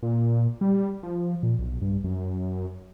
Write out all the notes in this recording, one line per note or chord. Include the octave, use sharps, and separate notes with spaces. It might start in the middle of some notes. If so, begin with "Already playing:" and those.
A#2
G3
F3
A#2
B1
G2
F#2